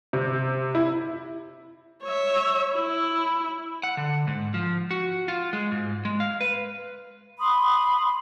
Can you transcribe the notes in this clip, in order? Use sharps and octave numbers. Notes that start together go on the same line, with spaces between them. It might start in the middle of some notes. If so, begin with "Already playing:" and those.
C3
E4
C#5 E5
E4
F#5
D3
G#2
F3
F#4
F4
G#3
G#2
G#3
F5
B4
B5 C6 D#6